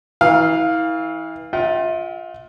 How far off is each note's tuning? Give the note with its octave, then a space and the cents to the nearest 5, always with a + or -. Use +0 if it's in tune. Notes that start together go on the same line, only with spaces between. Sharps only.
E3 -30 F5 +0
F4 +20 E5 -35 G5 -40